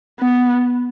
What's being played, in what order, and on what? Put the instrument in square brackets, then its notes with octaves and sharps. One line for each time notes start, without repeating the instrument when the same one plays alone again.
[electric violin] B3